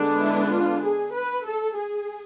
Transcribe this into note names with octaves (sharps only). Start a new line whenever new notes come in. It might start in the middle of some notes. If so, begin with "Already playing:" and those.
Already playing: D3 G#3 B3 D4
E4
F4
G#4
B4
A4
G#4